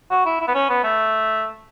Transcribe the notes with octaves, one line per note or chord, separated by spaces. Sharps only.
F#4
E4
E4
B3
C#4
B3
A3